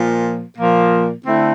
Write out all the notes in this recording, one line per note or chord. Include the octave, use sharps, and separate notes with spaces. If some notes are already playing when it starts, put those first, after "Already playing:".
Already playing: A#2 F3 A#3
A#2 F3 A#3
D3 A3 C4 E4